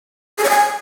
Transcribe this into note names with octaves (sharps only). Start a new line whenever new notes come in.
G#4
C#5
G#5